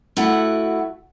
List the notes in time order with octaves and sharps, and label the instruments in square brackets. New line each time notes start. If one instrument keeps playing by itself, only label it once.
[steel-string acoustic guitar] A3 E4 F#4 F#5